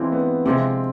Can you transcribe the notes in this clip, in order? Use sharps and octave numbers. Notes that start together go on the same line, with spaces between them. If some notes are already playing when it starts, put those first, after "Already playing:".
Already playing: E3 G#3 C4 D4 F4
B3
C3 F3 G#3 C4